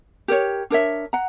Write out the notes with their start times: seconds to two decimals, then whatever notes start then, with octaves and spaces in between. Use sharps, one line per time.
0.28 G4 A#4 C#5
0.70 D4 A#4 C#5 E5
1.13 F#5 A#5